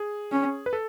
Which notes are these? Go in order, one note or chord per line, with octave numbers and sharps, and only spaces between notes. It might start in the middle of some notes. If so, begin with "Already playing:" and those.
Already playing: G#4
C#4
B4
A4